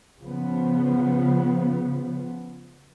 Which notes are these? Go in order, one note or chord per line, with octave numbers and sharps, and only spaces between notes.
C#3 F3 B3